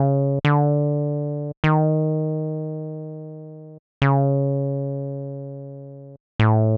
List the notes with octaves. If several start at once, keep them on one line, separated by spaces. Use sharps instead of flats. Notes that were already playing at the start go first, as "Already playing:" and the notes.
Already playing: C#3
D3
D#3
C#3
A2